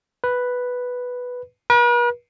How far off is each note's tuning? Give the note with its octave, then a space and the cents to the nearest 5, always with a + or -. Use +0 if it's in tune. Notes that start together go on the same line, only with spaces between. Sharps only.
B4 +0
B4 -45